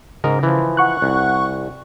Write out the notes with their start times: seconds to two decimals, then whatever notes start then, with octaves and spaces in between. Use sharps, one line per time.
0.24 G#2 C#3 A#4 D#5
0.43 E3 F3
0.77 F#5 C#6 F#6
1.02 C2